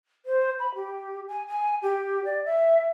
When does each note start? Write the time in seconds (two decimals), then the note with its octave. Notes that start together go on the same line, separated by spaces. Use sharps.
0.25 C5
0.59 B5
0.74 G4
1.28 G#5
1.47 G#5
1.82 G4
2.25 D5
2.45 E5